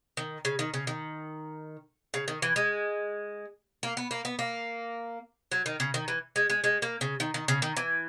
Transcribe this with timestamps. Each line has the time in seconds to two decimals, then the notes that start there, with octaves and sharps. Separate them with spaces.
0.17 D#3
0.45 C#3
0.59 D#3
0.74 C#3
0.87 D#3
2.14 C#3
2.28 D#3
2.42 E3
2.56 G#3
3.83 A#3
3.97 B3
4.11 A#3
4.25 B3
4.39 A#3
5.52 F#3
5.66 D#3
5.80 C#3
5.94 D#3
6.08 E3
6.36 G#3
6.50 G#3
6.64 G#3
6.82 A#3
7.01 C#3
7.20 D#3
7.34 D#3
7.48 C#3
7.62 D#3
7.77 E3